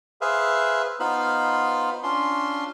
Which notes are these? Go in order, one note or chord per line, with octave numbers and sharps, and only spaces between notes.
G#4 B4 C5 E5 F5
B3 D#4 F4 C5 F5 B5
C#4 D4 F4 C6